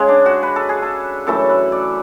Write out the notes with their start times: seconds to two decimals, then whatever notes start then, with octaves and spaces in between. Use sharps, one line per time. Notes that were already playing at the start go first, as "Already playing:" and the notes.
Already playing: C#3 G#3
0.08 D4
0.26 F#4
0.43 B4
0.56 A4
0.69 G#4
0.82 A4
1.27 F#2 E3 A3 A4
1.49 B4
1.72 D5